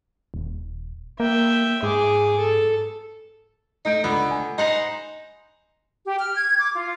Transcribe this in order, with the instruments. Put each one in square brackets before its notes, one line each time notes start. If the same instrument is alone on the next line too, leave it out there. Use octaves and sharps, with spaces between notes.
[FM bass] D#1
[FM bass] A#3 [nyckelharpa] E5 G5
[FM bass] G#2 [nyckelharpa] G#4 D6
[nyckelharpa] A4
[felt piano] A3 G6 D7 [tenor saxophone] D#4
[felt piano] C#2 [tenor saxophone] D3 [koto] B3
[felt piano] G#5
[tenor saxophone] D#4 [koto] C5 F#5 A#5
[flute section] G4
F6
G#6
D6
F4